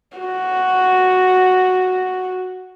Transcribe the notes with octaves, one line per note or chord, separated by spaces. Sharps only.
F#4